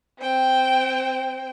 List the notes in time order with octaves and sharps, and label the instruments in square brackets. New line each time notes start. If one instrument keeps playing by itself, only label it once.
[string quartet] C4 G5